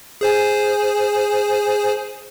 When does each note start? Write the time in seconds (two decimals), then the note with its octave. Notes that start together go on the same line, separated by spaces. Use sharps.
0.21 G#4 C5 G#5